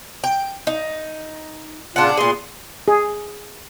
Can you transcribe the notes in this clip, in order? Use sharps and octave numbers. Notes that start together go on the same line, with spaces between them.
G5
D#4
A#2 C#3 D4 F4 F#5
A#2 B3 G#4 C6
G#4